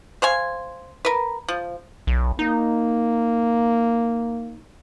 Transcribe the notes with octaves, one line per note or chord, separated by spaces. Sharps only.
C5 F5 G#5
A#4 B4
F3
B1
A#3 D#4